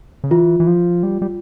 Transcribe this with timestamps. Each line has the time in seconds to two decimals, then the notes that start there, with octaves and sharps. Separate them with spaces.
0.24 C#3
0.31 E3 F4
0.60 E3
0.67 F3
1.03 G3
1.22 G3